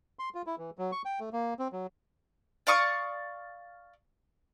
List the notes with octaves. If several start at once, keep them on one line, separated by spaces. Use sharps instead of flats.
C6
F4
E4
E3
F#3
C#6
G5
A3
A#3
C4
F#3
D5 F5 C#6 D#6